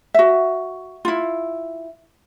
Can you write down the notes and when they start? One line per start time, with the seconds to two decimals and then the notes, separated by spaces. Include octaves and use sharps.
0.14 F#4 E5
1.05 E4 F4